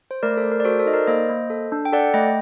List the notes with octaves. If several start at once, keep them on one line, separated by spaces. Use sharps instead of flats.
C5
A3 A#4 D5
A4 C5
A3
A#4
D5
F#4 A4 C5
A4 C5
D#4 D#5
A#4 D5
A#3 C5 D#5
A#3
A4
D4
G5
A4 D5 F#5
A3 D#5 G5